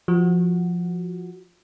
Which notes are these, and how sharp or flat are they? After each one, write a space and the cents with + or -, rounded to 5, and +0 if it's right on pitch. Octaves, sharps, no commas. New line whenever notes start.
F3 +0 F#4 +0